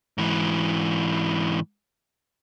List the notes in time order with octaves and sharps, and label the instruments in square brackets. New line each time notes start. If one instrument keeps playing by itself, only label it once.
[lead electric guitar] G#2 E3